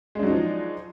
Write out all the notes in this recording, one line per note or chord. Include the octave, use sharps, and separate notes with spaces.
F3 F#3 G#3 D4 D#4